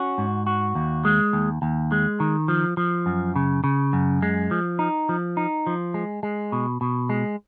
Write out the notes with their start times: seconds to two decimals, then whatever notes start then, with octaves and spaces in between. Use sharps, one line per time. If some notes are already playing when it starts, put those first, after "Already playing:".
Already playing: C#4 F#4
0.18 G#2
0.47 F#4
0.75 D#2
1.05 G#3
1.33 D#2
1.62 D#2
1.92 G#3
2.20 D#3
2.48 F3
2.77 F3
3.06 F#2
3.36 C#3
3.64 C#3
3.93 F#2
4.22 G#3
4.51 F3
4.79 D#4
5.09 F3
5.37 D#4
5.67 F3
5.94 G#3
6.23 G#3
6.52 B2
6.81 B2
7.10 G#3